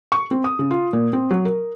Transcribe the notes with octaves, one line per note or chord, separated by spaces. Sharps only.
C#6
C4
D#6
C#3
F4
A#2
C4
F#3
A#4